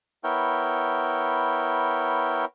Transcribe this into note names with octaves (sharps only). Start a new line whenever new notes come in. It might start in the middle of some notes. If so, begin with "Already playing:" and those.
B3 E4 A#4 C#5 G5